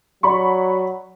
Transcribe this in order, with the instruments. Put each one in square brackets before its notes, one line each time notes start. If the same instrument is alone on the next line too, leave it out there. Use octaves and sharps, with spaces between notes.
[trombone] F#3 [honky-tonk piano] D5 B5 C#6